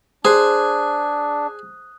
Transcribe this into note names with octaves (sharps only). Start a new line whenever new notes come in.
D4 G#4 C5 D#6 F#6